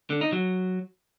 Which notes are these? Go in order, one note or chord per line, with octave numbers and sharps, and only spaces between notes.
D3
D#4
F#3